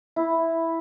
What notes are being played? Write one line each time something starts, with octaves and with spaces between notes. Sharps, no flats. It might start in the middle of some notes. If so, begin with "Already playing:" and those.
E4